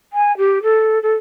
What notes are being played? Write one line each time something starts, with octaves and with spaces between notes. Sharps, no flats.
G#5
G4
A4
A4